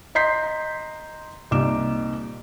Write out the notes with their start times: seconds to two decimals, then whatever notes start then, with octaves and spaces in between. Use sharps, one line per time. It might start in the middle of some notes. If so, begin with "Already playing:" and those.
0.15 D#5 A#5 C6 G6 B6 C7
1.51 C2 A#2 D#4 D6 E7